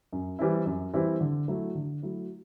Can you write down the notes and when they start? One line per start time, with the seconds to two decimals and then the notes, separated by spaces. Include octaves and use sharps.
0.12 F#2
0.39 E3 G3 C4 E4
0.66 F#2
0.94 E3 G3 C4 E4
1.21 D3
1.48 F#3 A3 E4
1.75 D3
2.03 F#3 A3 E4